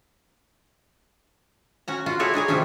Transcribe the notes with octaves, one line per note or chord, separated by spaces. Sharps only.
C#4 F#4 A#5
F4 F#4
E4 F#4 G#4 A4 C#5 D5
D4 D#4 G#4 C#5
C3 D#3 F3 A3 C#4 D4